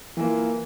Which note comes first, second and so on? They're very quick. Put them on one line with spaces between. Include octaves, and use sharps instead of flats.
E3 A#3 F4